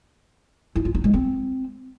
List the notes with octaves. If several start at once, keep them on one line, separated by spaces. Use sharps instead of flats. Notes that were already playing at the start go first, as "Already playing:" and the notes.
E4
F4
D#4
G#3
C4